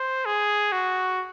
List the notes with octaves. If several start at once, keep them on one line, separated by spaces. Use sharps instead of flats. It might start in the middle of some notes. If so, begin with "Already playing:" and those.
Already playing: C5
G#4
F#4